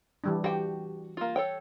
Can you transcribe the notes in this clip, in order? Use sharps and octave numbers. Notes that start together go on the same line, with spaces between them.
E3 G3 D4
F#4 G4 G5
A#3 F4
A4 C#5 G5